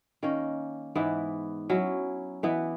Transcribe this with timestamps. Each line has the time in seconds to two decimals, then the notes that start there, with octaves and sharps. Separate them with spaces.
0.23 D#3 A#3 C#4
0.95 G#2 E3 B3 E4
1.69 F#3 C#4 E4
2.43 E3 B3 E4